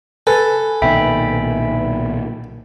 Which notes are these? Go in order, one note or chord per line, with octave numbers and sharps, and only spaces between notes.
A4 B4 G#5
B1 A#2 D#3 E5 G5 B5